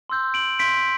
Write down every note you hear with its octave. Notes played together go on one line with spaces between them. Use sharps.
C6 E6 G6
D7 F#7
C6 G6 B6 D7